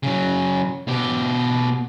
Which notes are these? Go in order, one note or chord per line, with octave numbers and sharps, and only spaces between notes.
C#3 F#3
B2 G4